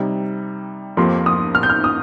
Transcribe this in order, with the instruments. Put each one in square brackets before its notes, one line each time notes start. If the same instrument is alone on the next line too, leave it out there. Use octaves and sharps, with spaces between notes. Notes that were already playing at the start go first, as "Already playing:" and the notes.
Already playing: [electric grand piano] C3 G3 D#4
[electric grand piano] F2 F3 A#3 G4 A#4 [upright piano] C6
[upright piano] D#6
F6
G6
F6
D#6